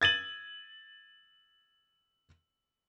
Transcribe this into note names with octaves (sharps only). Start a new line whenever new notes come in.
G#6 A6 D#7 F#7